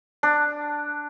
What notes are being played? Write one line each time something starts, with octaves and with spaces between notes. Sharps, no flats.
D4